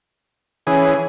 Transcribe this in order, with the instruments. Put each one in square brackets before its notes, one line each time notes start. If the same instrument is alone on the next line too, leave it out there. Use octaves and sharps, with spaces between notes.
[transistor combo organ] E3 G#4 [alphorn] C#4